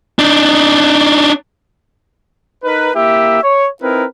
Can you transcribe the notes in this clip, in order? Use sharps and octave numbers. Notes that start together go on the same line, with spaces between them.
D4 D#4
D#4 A#4 B4
A#3 E4 G4 E5
C#5
C4 D#4 E4 A#4 B4